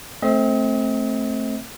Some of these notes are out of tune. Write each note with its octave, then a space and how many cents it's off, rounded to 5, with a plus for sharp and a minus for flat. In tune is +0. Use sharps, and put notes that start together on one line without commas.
A3 +0 C4 +15 D#5 +45